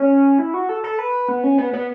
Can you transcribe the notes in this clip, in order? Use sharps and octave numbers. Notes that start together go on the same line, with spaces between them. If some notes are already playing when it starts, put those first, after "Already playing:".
Already playing: C#4
E4
F#4
A4
A4
B4
B3
C#4
B3
B3